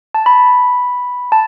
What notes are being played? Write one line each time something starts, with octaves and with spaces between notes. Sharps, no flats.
A5
B5
A5